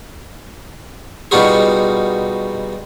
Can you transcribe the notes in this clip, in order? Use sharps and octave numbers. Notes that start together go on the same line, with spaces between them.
B2 G3 D#4 F4 F#4 G#4